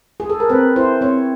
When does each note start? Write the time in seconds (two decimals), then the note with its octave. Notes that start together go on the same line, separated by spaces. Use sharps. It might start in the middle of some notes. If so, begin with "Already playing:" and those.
0.20 G#4
0.30 A4
0.40 A#4
0.49 C4 B4
0.76 E4 C5
1.01 C4 C#5